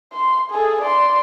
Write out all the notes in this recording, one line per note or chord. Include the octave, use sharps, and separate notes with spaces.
C6
G#4 A4
D5 C6